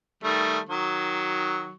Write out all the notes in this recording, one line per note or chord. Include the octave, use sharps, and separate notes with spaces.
D#3 G3 A3
D#3 F#3 C#6